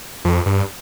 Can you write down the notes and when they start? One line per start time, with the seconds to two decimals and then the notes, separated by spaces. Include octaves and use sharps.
0.25 F2
0.46 G2